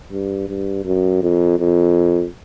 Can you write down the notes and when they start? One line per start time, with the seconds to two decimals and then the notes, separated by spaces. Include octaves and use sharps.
0.11 G2
0.48 G2
0.85 F#2
1.23 F2
1.59 F2